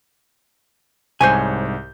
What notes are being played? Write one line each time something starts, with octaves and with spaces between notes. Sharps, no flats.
C2 G#2 C5 C#5 G#5 G6